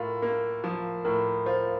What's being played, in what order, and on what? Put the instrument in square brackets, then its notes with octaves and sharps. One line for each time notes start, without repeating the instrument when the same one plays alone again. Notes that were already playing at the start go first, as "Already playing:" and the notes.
Already playing: [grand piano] A2 F4 [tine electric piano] A#4
[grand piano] A#3
F3
[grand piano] A2 [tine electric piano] A#4
[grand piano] F4 [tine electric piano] C5